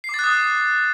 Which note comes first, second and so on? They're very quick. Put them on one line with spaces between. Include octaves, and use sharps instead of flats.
C7 D6 A6 F#6 D#6